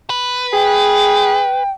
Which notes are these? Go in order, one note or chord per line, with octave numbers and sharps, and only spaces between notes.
B4
G#4 G5